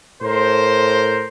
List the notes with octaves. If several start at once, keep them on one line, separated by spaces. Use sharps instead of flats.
A2 A#4 C5